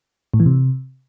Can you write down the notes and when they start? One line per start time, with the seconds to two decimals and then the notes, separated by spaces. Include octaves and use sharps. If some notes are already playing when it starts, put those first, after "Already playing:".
0.34 A2
0.40 E3
0.46 C3